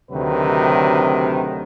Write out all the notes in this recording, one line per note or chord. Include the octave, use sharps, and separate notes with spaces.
D2 C3 D#3 F#3 B4